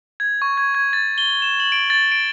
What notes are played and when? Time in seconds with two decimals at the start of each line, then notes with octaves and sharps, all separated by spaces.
0.20 G#6
0.42 C#6
0.57 G#6
0.75 G#6
0.93 A6
1.18 G7
1.42 E7
1.60 F#7
1.72 D7
1.90 A6
2.12 D7